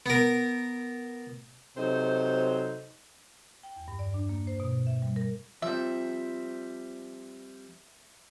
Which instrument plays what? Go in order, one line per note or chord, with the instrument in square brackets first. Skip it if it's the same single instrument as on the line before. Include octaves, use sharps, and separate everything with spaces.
[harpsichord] B3 A#4
[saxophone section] C3 F#3 D#4 A4 C5
[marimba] G5
E2
G2
D5
D4
A#3
C5
B2
E5
G3
A#4
[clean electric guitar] F3 G3 C4 [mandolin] E5